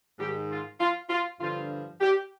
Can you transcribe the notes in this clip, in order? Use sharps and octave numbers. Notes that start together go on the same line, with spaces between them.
G#2 D#3 G4
F4
F4
F4
G2 D3 F3 F4
G4